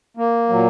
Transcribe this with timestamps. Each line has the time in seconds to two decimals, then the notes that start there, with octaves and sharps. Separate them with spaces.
0.17 A#3
0.49 A#2 F#3